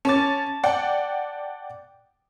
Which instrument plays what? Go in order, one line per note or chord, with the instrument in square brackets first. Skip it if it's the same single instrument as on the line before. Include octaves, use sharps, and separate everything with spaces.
[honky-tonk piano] C#4 A6 [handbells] A5 D6
[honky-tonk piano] D5 F#5 G5